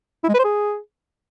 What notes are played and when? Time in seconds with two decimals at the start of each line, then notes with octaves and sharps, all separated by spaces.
0.24 E4
0.29 G#3
0.34 B4
0.39 C5
0.45 G#4